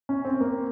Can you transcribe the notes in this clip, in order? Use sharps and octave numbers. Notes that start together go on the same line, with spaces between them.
C#4
C4
A#3